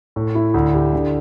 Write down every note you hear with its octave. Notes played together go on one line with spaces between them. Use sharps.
A2
E4
D2
G4
D3